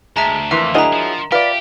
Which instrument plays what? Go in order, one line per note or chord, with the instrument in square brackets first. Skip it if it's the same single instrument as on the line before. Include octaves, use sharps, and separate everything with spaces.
[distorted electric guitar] D2 [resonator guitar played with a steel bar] G#3 [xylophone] E5 A5 A#5
[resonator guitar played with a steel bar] F2 E3 A#3 [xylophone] E5
[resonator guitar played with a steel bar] F#3 E4 G#4 [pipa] D4 D#5 F#5 [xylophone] A#4 A#5
[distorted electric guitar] F3
[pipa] F4 [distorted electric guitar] G4 [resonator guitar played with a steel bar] B4 D5 [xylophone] E5